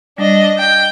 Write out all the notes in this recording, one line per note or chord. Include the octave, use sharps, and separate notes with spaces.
G3 D4 D#5
G5